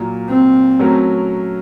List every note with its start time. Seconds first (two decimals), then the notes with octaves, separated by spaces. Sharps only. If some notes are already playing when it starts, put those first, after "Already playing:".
Already playing: A#2 F#3 A#3
0.30 C4
0.79 F#3 A3 C#4 F#4 A#4